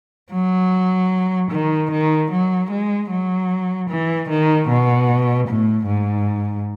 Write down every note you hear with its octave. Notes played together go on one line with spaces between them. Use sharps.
F#3
D#3
D#3
F#3
G#3
F#3
E3
D#3
B2
A2
G#2